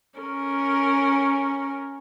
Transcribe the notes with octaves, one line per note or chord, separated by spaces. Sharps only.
C#4 A#4